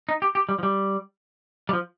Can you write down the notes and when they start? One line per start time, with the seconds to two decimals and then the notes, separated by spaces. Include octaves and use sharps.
0.09 D#4
0.22 G4
0.35 G4
0.49 G3
0.59 F3
0.63 G3
1.69 G3
1.73 F3